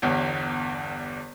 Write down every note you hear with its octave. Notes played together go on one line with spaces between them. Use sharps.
G1 E2 G2